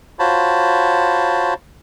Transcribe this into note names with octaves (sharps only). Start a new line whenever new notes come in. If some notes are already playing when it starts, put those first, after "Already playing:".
F4 F#4 C5 C#5 A5 B5